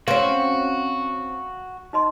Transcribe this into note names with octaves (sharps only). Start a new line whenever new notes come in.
C4 C#4 F#4 F5
D#4 D#5 C6